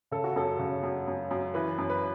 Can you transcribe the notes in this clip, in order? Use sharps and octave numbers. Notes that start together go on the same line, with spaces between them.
C#3 A4
F#4
F#2 A4
C#3
F#2
F#2
F#2
E3 B4
F#2
B4